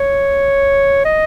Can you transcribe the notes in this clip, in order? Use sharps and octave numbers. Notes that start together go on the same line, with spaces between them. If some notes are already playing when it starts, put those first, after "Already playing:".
Already playing: C#5
D#5